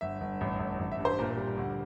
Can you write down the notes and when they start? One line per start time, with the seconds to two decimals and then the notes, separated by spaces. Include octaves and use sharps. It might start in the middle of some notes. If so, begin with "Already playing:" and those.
0.01 G1 E5
0.21 G1
0.41 A1
0.60 A1
0.79 A1
0.92 E5
0.99 G2
1.05 C5
1.18 A#2 A#4
1.37 G3
1.57 D2